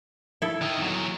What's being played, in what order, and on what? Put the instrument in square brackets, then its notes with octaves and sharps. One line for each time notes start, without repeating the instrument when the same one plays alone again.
[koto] E4 A4
[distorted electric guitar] D#3 D#5
E2 F#3